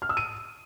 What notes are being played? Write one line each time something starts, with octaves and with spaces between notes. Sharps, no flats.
F6
E6
D#7